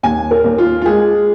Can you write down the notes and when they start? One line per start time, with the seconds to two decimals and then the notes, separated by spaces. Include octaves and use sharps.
0.03 D#2 G#5
0.31 A#4
0.44 D#2
0.58 F4
0.82 F4
0.86 G#3 G#4